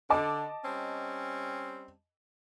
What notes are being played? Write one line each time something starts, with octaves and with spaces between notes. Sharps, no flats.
D3 D#5 A5 D6
G3 C4 C#4